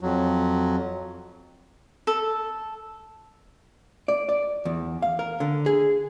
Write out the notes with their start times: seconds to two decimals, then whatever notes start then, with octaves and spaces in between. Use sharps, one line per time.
0.01 F2 F#3
2.07 A4
4.08 D5
4.29 D5
4.65 E2
5.02 F5
5.19 A#4
5.40 D3
5.66 G#4